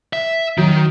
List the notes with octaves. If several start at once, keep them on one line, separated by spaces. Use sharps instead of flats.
E5
D#3 F#3